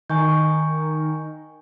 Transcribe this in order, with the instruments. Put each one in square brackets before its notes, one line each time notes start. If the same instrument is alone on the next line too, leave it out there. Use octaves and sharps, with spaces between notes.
[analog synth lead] D#3 [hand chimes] G#5 C#6 G6